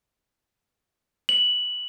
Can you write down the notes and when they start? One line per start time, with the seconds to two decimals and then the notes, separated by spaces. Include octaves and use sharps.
1.29 F#7